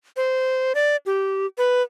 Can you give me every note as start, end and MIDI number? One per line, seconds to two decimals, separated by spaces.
0.17 0.73 72
0.75 0.96 74
1.06 1.46 67
1.58 1.82 71